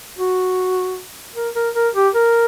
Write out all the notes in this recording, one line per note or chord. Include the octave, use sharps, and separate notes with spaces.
F#4
A#4
A#4
A#4
G4
A#4